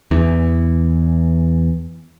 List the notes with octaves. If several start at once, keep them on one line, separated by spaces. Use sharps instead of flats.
E2 E3